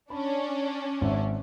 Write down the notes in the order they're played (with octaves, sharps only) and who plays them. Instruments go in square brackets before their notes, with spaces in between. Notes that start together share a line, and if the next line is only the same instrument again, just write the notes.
[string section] C#4 D4 [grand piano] B5
[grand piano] G#1 E5